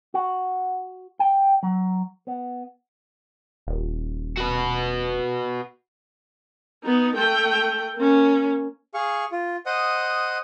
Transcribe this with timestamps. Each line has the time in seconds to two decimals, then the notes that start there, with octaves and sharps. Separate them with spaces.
0.14 F#4
1.19 G5
1.63 F#3
2.27 B3
3.67 D#1
4.37 F#4 B4
6.84 B3 D#4
7.16 A3 G5
7.96 A#3 C#4
8.94 G#4 F5 C#6
9.32 F4
9.66 C5 D#5 F#5 D#6